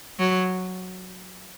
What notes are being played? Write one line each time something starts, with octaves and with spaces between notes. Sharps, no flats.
F#3